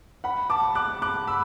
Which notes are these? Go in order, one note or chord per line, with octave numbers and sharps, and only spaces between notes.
F#5 B5
A5 D6
D6 F#6
D6 F#6
B5 E6